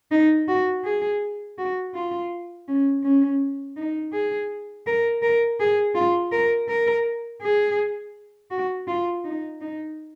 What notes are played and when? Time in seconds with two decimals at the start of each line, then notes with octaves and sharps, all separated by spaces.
0.11 D#4
0.48 F#4
0.84 G#4
1.58 F#4
1.94 F4
2.68 C#4
3.03 C#4
3.76 D#4
4.13 G#4
4.86 A#4
5.22 A#4
5.60 G#4
5.95 F4
6.32 A#4
6.69 A#4
7.42 G#4
8.51 F#4
8.88 F4
9.24 D#4
9.61 D#4